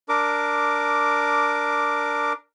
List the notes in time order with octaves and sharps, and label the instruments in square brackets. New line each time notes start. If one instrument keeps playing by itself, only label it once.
[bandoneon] D4 A#4 D6